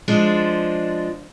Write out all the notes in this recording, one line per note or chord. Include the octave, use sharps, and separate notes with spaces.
F3 G#3 D4